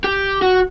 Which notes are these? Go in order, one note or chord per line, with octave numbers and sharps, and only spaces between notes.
G4
F#4